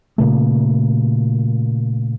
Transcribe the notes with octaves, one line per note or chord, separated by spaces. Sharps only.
A#2 C#3 A3